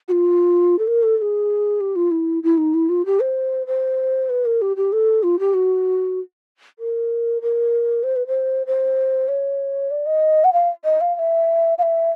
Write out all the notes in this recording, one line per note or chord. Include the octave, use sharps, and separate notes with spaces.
F#4
F4
A4
A#4
A4
A4
G#4
G4
F4
E4
E4
D#4
E4
F4
G4
C5
C5
B4
A#4
G4
G4
A4
F4
G4
F#4
A#4
A#4
C5
B4
C5
C5
C#5
D5
D#5
F#5
F5
D#5
F5
F5
E5
F5
E5